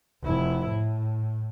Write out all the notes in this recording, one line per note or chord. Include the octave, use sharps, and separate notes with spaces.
F1 E4
A2